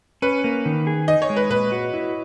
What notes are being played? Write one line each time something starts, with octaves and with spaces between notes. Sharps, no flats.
C#4 B4
A#3
D#3
G#4
D#4 D#5
C#5
G#3
B4
A#2 B4
F#4
E4